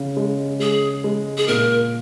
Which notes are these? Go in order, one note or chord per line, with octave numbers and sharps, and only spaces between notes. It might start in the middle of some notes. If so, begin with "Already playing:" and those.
Already playing: C#3
G#3
G#3 G#4
G#3
G#4
A#2 A#4